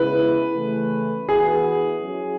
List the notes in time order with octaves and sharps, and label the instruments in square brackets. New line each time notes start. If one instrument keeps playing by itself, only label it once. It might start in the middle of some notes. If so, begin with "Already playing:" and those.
Already playing: [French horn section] C#3 G#3 B3 E4 [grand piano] B4
[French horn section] C#3 E3 A3
[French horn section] E3 B3 F#4 B4 [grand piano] G#4
[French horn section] F#3 C#4 E4 G#4 C#5